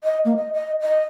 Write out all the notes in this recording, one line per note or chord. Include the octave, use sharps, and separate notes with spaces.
D#5
A#3
D#5
D#5
D#5